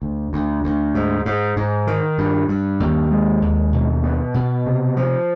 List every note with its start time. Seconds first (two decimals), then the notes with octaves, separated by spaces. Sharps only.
0.02 D2
0.33 D2
0.64 D2
0.95 G#2
1.25 G#2
1.56 G#2
1.87 D#3
2.18 G2
2.48 G2
2.80 D#2
3.11 G#3
3.42 D#2
3.73 B2
4.04 B3
4.34 B2
4.66 C3
4.97 F3